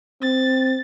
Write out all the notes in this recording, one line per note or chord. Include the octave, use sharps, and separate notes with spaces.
C4 A6